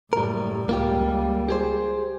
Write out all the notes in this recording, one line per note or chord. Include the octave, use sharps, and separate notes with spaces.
F#1 A2 G3 A#4
C#2 G3 A#3 F4 G4
G4 G#4 C5